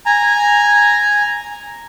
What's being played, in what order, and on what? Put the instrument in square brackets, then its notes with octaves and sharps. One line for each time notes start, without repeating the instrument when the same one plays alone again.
[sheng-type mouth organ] G#5 A#5